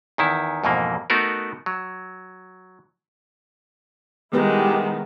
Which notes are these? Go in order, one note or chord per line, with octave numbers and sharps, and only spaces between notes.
E2 D#3 E4
F2 G#2 B2 E3 A#3
A3 B3 D#4 F#4 A#4
F#3
D#3 G3 G#3 B3 E4 G4 B4